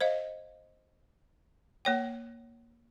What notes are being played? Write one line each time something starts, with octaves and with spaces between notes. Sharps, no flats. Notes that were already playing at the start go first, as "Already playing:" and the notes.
C5 D#5 F5
A#3 C#5 G5